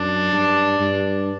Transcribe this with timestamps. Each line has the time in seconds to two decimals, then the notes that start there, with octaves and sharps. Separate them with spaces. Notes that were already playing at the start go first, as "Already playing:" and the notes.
Already playing: F#2 D4
0.32 G2
0.80 G2